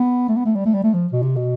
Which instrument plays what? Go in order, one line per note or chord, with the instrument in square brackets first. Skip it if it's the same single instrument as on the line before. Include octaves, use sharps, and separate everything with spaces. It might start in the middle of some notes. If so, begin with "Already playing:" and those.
Already playing: [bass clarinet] B3
A3
B3
A3
G3
A3
G3
A3
F3
B2
C3
B2